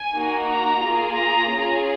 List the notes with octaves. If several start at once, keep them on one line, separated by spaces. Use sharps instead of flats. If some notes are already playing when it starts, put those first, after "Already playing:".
Already playing: G#5
A#3 D#4 F#4
A#5
A#3 F4 G#4
A#5
C#4 F4 G#4